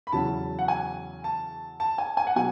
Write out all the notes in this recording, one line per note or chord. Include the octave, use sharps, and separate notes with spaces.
B5
E2 C#3 F#3 C#4 E4 A5
F#5
G#5
A5
A5
G#5
G#5
F#5
B2 F#3 G#5